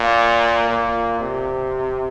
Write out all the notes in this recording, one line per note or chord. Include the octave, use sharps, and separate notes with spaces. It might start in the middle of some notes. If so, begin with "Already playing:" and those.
Already playing: A#2
A#2
C3